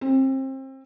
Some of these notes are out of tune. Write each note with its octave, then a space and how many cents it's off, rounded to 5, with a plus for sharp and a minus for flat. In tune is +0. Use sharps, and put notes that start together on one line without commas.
C4 +30